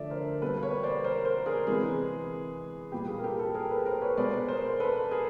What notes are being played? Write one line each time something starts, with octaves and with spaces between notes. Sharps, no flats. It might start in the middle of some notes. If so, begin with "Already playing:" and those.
Already playing: D3 F3 A3 D5 E5
A#4 C5
B2 G3 A#3 A4 B4
B4 C#5
C5 D5
A#4 C5
A#4 C5
G#4 A#4
C3 E3 G#3 B3 G#4
A#2 G3 B3 G4
G#4
A#4
G4 A4
G4 A4
G#4 A#4
A4 B4
A#4 C5
B4 C#5
B2 G#3 B3 C5 D5
A#4 C5
A4 B4
G#4 A#4